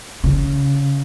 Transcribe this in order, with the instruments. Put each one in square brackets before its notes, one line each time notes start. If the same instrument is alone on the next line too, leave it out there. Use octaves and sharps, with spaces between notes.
[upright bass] C#3